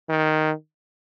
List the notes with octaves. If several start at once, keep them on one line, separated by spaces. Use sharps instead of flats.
D#3